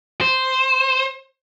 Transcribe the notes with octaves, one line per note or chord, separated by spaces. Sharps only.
C5